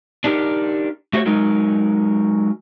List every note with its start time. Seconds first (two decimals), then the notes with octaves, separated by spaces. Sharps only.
0.24 D4 D#4 G4 G#4 A#4
1.13 A3 F#4 G4 C5 C#5
1.26 F#3 G#3 D#4 A#4